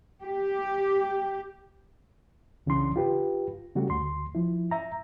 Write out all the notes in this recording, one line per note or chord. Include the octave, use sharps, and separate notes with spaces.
G4
C2 C#3 E3 D4 C6
F4 G4 B4
C#3 G3 A3 F#4
D2 C6
F3 E4
E5 A#5